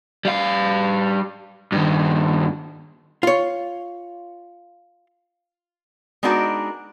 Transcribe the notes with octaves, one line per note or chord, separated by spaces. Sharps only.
G3 F5
G2 D#3
F4 C#5
G#3 B3 D4 D#4 F#4 A#4